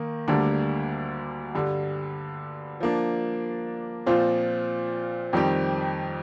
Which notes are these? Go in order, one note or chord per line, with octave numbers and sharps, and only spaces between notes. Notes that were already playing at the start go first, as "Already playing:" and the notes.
Already playing: D#3 A#3
D2 D3 G3 A#3 D4
G2 D3 G3
F3 A#3 D4
A#2 F3 C4 F4 C5
F2 D#3 G3 C4 G4